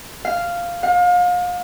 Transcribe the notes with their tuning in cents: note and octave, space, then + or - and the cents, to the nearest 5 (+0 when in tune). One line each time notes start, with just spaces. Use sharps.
F5 -5
F5 +35